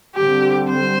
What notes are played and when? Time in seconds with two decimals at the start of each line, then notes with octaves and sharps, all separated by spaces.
0.16 D3 G3 C4 G4
0.70 C5